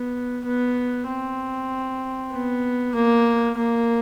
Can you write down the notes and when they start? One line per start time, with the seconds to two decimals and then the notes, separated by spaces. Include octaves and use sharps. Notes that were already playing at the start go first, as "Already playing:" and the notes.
Already playing: B3
0.45 B3
1.08 C4
2.32 B3
2.95 A#3
3.58 A#3